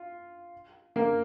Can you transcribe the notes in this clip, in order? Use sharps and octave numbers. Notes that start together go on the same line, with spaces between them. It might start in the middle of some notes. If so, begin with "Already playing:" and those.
Already playing: F4
A#3 A#4